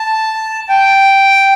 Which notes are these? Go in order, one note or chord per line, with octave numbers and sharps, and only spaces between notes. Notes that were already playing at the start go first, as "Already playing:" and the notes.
Already playing: A5
G5